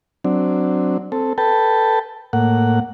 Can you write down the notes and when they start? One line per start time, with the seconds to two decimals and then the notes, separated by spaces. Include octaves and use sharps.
0.25 F#3 C4 D4
1.12 C4 A4
1.38 A4 B4 G5 A5
2.33 A2 A#3 F#5